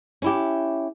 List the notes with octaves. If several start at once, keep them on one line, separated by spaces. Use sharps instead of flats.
C#4 E4 G4